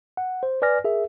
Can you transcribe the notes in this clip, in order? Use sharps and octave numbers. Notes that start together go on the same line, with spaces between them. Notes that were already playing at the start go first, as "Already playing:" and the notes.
F#5
C5
B4 D5 G#5 F6 A#6
G#4 A#4 E5